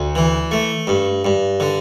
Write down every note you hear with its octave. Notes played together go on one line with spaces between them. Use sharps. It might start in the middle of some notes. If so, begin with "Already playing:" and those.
Already playing: D2
E3
A3
G2
G2
D3